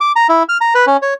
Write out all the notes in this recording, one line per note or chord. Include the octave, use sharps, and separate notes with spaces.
D6
A#5
E4
F6
A#5
B4
C#4
C#5